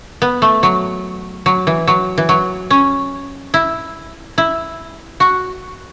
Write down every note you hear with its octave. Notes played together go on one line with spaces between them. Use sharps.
B3
A3
F#3
F#3
E3
F#3
E3
F#3
C#4
E4
E4
F#4